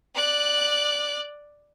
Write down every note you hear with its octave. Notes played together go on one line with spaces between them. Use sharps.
D5 F#6